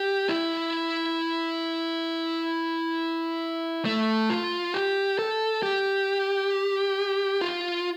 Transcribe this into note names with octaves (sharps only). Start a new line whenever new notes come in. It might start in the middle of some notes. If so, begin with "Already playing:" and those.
Already playing: G4
E4
A3
F4
G4
A4
G4
F4